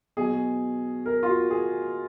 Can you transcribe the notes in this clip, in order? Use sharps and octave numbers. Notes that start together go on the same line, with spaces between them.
B2 F#3 G#4
A#4
F4
F#4
G#4